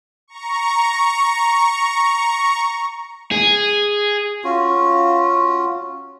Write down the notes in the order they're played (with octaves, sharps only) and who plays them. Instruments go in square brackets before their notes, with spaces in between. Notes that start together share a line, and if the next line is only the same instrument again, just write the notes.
[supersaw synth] A#5 C#6
[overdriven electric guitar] G#4
[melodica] C#4 F4 F#4